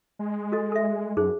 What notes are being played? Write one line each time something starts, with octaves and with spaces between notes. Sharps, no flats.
G#3
F#4 A4 D#5
A4 E5
F#2 D#4 G#4 C5